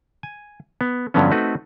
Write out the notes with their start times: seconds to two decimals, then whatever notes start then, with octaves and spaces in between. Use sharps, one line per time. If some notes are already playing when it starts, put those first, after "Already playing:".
0.23 G#5
0.81 B3
1.14 G2 D3 F3 F#3 B3 C#4
1.31 A3 C4 D#4 F#4 B4